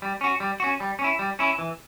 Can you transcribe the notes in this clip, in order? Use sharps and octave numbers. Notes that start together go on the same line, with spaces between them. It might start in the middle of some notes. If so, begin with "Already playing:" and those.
G3
C#4 F#4
G3
C#4 F#4
G3
C#4
E4
G3
C#4 E4
E3